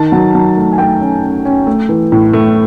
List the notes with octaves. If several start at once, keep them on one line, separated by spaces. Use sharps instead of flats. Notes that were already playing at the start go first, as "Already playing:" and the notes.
Already playing: D#3 A5
F#3
F#3
A3
G#5
A3 G5
C#4
C#4
C#4
A3
E3
A2
A3